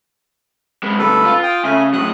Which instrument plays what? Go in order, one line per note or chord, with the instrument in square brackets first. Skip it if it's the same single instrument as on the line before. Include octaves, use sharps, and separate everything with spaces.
[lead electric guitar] G#3 B3
[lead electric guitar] D2 G2 [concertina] A4 B4
[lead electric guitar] F4
[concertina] G5 D#6
[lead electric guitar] C#3 [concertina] A3 G#5
[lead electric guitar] A2 F#3 [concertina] D#6 F#6